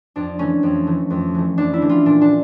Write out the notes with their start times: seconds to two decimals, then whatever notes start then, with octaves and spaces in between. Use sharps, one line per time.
0.16 F2 D4
0.39 E3 A3 C#4
0.63 F2
0.87 E3 A3
1.10 F2
1.35 E3 A3
1.57 F2 D4
1.73 E4
1.82 E3 A3
1.89 F4
2.06 A#2 D4
2.21 D4